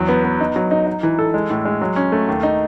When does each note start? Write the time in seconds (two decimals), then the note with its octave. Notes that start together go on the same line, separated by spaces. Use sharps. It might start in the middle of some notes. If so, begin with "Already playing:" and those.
Already playing: E2 F#3
0.09 B3
0.24 B3
0.41 D#4
0.56 F#3
0.71 D#4
0.87 D#4
1.03 E3
1.19 A4
1.34 G#3
1.50 A2
1.65 G#3
1.81 F#3
1.96 C#4
2.12 A3
2.28 D#2
2.43 D#4